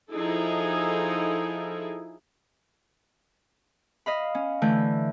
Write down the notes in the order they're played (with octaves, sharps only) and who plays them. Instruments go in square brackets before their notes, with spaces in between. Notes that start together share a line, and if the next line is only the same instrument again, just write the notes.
[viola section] F3 D#4 E4 G#4 A4
[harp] D#5 F5 B5
C#4
D3 E3 A3 G6